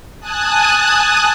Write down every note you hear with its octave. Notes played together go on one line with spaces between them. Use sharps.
G#5 A5 D#6 F#6